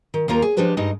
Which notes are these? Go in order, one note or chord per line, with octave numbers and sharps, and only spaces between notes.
D#3
D#2 A#3 F4 A#5
G#4
F3 G#3 D4 G4 B4 C5
G2 G#3 D#4 G4 D#5